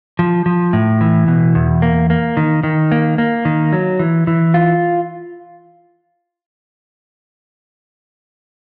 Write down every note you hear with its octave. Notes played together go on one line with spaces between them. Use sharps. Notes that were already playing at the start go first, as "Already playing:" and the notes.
F3
F3
A2
E3
B2
E2
A#3
A#3
D#3
D#3
A#3
A#3
D#3
F#3
E3
E3
F4